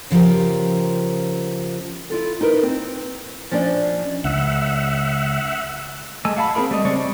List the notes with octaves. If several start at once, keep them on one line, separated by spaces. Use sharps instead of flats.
C#3 F3 F4 G4 A#4
E4 F4 A4
D#4 E4 A#4 B4
C4
F3 C#4 D4 D5 D#5
C#2 E5 F#5
G#3 A3 G#5 E6
F#4 F5 A5 B5
C4 D4 G#4 A#4 B5
G3 A3 D#5
C#3 G#3 C4 D5 C#6
G3